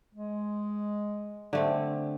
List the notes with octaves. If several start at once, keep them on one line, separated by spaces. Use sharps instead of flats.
G#3
D3 A3 C4